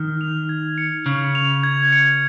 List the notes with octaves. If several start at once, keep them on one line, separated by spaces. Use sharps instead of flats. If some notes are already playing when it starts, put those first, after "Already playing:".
Already playing: D#3 F6
F7
G#6
C#7
C#3 F6
F7
G#6
C#7